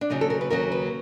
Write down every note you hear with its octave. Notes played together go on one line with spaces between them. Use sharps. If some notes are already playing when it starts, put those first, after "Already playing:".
D4
D#2 C#3 F#3 D#4
A4
A#4
B4
D#2 C#3 F#3 A#4
B4